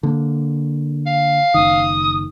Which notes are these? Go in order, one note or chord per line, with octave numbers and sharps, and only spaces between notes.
D3 A#3
F5
F#1 D#3 D#6